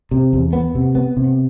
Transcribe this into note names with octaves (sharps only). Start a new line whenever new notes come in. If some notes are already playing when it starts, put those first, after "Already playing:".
C3
E2
B3
C3
B3
C3